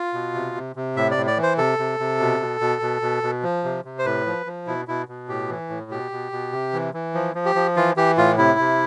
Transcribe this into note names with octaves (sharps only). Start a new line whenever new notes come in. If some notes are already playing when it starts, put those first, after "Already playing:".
Already playing: F4
B2
C3
C3
C3
A2 E5
D5
A2
D5
E3
C5
C3 A4
C3
C3
B2
B2
B2
B2
B2
B2
F3
C3
C3
C5
A2 B4
F3
F3
B2 E4
B2 E4
B2
A2 G4
E3
A2
B2 G4
B2
B2
C3
E3
E3
F3
F3
G4
F3
E3 F4
E3 G4
A2 F4
C3 E4
C3